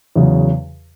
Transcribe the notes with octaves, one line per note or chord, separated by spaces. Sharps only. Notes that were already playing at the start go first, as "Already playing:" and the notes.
E2 C#3 F#3